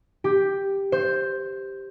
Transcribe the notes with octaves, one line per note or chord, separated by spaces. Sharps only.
G4
C5